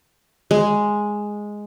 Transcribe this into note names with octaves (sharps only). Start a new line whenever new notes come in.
G#3